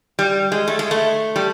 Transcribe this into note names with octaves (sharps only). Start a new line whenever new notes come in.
G3
G#3
A3
G#3
A3
G3